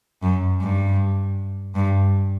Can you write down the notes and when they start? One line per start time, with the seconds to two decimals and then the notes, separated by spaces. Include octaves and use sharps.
0.23 F#2
0.61 G2
1.75 G2